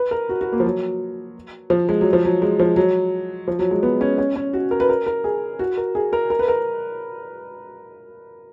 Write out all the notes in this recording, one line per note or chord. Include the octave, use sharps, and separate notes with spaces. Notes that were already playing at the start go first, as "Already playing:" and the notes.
Already playing: B4
A#4
F#4
F#4
A#3
F3
F#3
F3
G#3
F#3
F3
F#3
G#3
F3
F#3
F3
F#3
G#3
B3
C#4
C#4
C#4
F#4
A#4
B4
A#4
A#4
G#4
F#4
A#4
G#4
A#4
A#4
B4
A#4